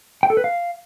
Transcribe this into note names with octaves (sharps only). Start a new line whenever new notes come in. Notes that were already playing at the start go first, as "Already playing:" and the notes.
G5
A4
B4
F5